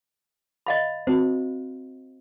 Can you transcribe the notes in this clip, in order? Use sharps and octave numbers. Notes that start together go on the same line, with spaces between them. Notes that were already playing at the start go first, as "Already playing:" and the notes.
D#5 F5 B5
C4 F#4 C5